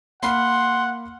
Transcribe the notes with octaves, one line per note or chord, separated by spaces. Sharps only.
A#3 F#5 B5 C6 F6